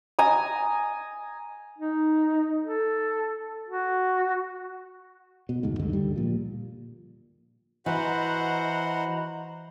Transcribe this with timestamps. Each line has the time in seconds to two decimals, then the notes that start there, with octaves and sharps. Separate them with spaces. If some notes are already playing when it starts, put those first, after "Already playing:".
0.19 G#5 A#5 D#6
1.78 D#4
2.63 A4
3.69 F#4
5.49 B2
5.63 F1 D2 G#2
5.79 D2 G2 D3 D#3
5.93 D3 G3
6.16 A#2 F3
7.86 E3 F#4 C5 D#5 F#5 A#5 B5